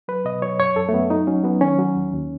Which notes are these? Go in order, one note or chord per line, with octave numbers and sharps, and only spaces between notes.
F#3 B4
B2 D#5
F#3 C#5
F#2 C#5
F#2 A4
A3
F#2 B3
F#3 D#4
F#3 C#4
F#3 B3
D#3 C#4
F#3
D#2
D#2